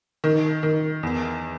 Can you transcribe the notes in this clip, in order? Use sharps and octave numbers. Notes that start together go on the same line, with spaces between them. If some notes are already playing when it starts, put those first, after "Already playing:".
D#3
D#3
E2